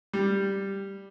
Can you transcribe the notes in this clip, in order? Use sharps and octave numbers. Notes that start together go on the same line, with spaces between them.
G3